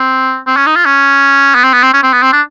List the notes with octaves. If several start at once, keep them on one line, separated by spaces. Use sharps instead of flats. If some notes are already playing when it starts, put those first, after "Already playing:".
Already playing: C4
C4
C#4
D#4
F4
C#4
B3
C4
B3
C4
C#4
C4
B3
C4
D4